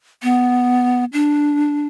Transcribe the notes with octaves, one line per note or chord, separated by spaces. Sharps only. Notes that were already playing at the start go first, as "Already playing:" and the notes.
B3
D4